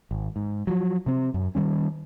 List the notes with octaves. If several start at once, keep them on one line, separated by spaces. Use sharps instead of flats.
G#1
G#2
F3 F#3
C3 C4
F#2
D#3 F3 G3 C#4